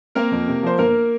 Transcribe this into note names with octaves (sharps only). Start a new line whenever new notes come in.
A#3 C4 A#4
F2
C3
F3 C5
G1 A#3 A#4